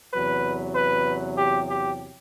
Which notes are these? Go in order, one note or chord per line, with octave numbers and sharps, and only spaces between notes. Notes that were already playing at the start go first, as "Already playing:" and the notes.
E2 C3 F#3 B4
B4
G4
G4